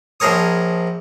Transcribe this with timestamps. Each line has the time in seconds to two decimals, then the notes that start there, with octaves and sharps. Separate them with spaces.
0.20 A#1 F3 G#4 A#4 C#5 D#6